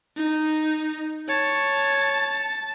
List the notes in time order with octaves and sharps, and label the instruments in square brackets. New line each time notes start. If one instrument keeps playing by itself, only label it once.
[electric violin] D#4
[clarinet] C#5 [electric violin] A5